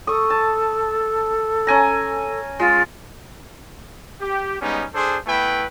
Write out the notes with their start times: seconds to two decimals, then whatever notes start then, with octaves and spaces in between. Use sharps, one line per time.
0.07 A4 C#6 D#6
0.30 A5
1.67 C#4 G#5 A#5
2.59 G#3 F4
4.21 G4
4.61 G3 G#3 B3 C#4 D#4
4.94 D4 G#4 A4 C5
5.26 A3 B3 E4 B4 G5